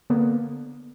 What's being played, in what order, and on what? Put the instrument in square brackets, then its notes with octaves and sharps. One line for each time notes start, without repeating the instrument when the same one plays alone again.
[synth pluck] D3 A#3 B3